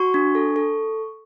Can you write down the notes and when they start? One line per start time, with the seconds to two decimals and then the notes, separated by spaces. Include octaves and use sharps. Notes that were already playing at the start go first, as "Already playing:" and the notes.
Already playing: F#4 C#6
0.14 D4
0.35 A4
0.56 A4